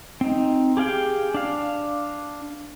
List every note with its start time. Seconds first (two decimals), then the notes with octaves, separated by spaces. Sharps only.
0.21 C4 D#4
0.77 G4 G#4 F5 G5
1.34 D4 F5